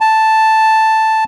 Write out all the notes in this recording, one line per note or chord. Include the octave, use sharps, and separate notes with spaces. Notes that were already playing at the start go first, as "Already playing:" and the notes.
A5